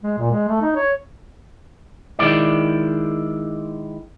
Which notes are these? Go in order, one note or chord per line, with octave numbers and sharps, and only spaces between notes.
G#3
A#2
G#3
A3
D#4
C#5
D#3 G#3 E4 D5